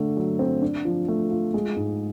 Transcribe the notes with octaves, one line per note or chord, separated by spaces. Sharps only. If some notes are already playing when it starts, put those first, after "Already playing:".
Already playing: D3 A3
F#3
C4
D4
F3
A3
F4
G#3
G#2